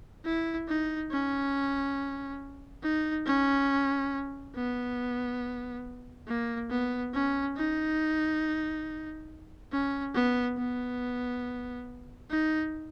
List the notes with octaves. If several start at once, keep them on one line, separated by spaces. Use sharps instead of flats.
E4
D#4
C#4
D#4
C#4
B3
A#3
B3
C#4
D#4
C#4
B3
B3
D#4